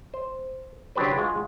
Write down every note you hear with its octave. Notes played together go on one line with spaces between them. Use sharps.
C5
C#3 F#3 D4 G4 B4 C5
G#3 F4 F#4